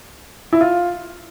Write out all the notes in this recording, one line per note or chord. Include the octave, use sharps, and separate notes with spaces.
E4
F4